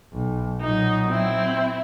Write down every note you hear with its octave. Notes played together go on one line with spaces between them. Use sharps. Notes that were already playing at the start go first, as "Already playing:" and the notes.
B1
A#2 F#3 D#4
C4 E4